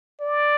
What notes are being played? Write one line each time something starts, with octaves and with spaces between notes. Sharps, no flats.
D5